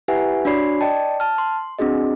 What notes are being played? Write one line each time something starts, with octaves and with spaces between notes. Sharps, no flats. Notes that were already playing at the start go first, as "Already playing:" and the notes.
E4 G4 B4 E5 F#5 G#5
D4 F#4 C#5 D5 B5 C7
D5 D#5 G5 A5
A5 F6
C6
C4 D4 F#4 G#4 D#5